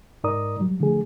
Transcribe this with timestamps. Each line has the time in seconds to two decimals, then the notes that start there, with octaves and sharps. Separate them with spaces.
0.24 G#2 D#4 A#4 D5 A#5 D#6
0.59 F#3 G3
0.80 D3 F3 A3 G#4